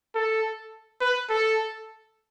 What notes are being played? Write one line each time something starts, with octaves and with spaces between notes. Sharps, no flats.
A4
B4
A4